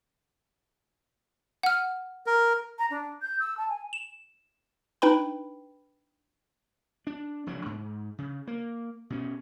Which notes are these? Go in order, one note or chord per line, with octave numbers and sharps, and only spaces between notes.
F#5 F6
A#4
A#5
D4
G6
E6
A5
G#5
E7
D4 D#4 B4 G5 B5
D4
F1 C#3 F#3 D4
G#2
C#3
A#3
B2 C#4